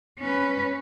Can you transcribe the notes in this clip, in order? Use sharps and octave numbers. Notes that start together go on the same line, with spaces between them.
C#4 B4